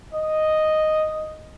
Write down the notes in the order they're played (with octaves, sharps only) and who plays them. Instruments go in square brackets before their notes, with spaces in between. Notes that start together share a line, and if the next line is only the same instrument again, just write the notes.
[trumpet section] D#5